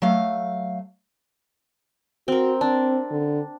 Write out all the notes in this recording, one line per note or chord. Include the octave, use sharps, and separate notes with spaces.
F#3 A3 F5
C4 F#4 A#4
C4 D4
D3